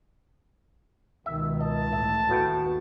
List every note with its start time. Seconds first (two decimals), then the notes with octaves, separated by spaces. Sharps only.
1.26 C#2 B2 D#3 E5
1.61 D#5 A5
1.93 A1 A2 E5
2.29 D#2 A2 B3 F#4 G5